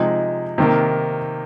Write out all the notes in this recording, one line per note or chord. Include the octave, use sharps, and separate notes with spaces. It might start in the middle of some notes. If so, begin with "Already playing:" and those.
Already playing: C3 F3 G#3 D#4
C3 D#3 A#3